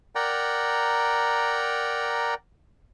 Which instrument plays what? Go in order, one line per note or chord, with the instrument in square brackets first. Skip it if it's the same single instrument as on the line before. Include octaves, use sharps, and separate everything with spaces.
[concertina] A#4 D5 F#5 G5 A#5